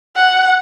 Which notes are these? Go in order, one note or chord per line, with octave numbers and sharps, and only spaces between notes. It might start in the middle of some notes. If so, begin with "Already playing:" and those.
F#5